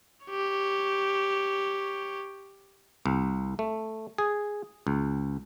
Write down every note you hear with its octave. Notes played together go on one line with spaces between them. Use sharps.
G4 C#5
C2
A3
G#4
C#2